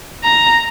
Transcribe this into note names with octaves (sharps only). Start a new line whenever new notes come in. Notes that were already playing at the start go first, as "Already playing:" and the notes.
A#5